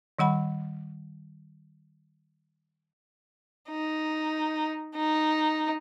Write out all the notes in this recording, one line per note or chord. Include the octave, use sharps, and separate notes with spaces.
D#3 G3 F#5 B5
D#4
D#4